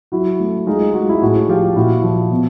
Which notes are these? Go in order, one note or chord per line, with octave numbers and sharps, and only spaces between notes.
F#3 E4 F#4
A3
G#3 D#4 F4
G#3 F#4
F4
E4 F#4
A2 F#4 G#4
F3 F4 G4
A#2 E4 F#4
F3
B2